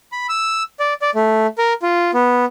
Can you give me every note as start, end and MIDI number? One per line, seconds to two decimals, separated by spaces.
0.12 0.27 83
0.29 0.63 88
0.80 0.94 74
1.02 1.10 74
1.15 1.47 57
1.58 1.73 70
1.82 2.11 65
2.14 2.45 59